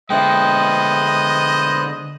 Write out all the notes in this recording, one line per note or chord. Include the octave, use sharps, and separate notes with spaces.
D3 G#3 B3 C5 D#5 E5 G5 F#6